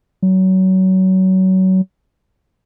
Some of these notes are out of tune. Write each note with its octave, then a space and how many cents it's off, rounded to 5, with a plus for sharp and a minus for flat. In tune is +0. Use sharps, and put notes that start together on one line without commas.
F#3 +25